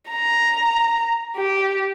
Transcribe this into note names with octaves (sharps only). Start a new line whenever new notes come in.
A#5
G4